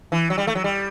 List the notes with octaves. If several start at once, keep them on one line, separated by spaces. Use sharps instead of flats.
E3
F#3
G3
A3
F#3
G3